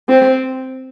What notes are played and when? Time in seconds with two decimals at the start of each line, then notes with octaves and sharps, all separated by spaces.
0.09 C4